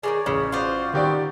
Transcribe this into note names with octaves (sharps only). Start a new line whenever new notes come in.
D#3 E3 G#3 C#5 D5
A1 C#3
F4 F#4 C5 D5
D#3 B3 C4 F#4 G4 D5